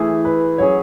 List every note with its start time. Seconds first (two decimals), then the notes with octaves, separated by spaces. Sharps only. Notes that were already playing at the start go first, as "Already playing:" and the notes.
Already playing: E3 A3 E4 G#4
0.25 B4
0.58 F#3 C#4 G#4 C#5